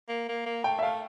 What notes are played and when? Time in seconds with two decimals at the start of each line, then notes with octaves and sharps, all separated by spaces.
0.09 A#3
0.28 A#3
0.46 A#3
0.64 A3 G5
0.79 E5
0.82 A3 F5